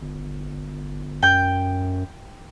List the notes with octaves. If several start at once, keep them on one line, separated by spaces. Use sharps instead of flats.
G1
F#2 G5 G6